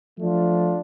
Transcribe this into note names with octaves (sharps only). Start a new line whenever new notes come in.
F3 A3 D4 F4